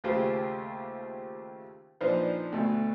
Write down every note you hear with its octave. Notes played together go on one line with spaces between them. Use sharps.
D#2 C#3 A3 F4 G4 C5
A#2 F3 D4 D#4 B4 C5
D2 B2 A3